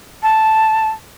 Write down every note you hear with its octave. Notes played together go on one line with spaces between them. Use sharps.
A5